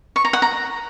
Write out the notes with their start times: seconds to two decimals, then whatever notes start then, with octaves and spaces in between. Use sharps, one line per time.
0.16 C#6
0.25 A#5
0.33 F#5
0.42 A#5